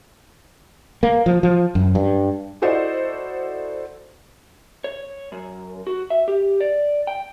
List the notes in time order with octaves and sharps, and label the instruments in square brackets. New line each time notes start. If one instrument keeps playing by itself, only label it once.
[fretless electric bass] A#3
F3
F3
F#2
G2
[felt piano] E4 F#4 A4 C5 D5 D#5
[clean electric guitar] C#5
F#2
F#4
E5
G4
D5
G5